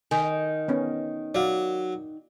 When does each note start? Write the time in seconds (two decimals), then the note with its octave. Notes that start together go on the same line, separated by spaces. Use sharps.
0.11 D#3 G#5
0.68 B3 C#4 D#5
1.35 F#3 D5 F5